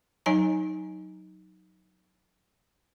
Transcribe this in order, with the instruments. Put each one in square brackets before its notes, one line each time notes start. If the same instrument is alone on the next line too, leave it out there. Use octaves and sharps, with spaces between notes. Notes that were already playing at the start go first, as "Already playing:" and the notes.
[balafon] F#3 D#4 C#5 G#5 A#5